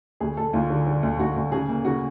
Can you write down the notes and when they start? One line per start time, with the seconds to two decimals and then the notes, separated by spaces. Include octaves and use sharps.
0.20 D2 G#4
0.37 D2 A4
0.53 D2 F4
0.70 D3
0.86 D3
1.03 D2
1.19 D2 F#4
1.36 D2
1.51 C#3 G#4
1.69 A#3
1.85 C#3 F#4